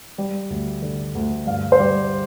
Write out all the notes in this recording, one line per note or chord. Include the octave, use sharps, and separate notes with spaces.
G3
D2
D3
D2
G2 F5
C5
G3 D5